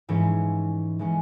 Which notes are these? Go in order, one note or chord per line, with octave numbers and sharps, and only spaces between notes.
G#2 E3 G#3 C#4
E3 G#3 C#4